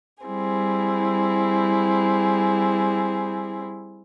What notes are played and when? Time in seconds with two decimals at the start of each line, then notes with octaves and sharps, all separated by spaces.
0.25 G3 C4 E4 G#4